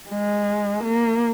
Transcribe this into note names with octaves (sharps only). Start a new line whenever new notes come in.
G#3
A#3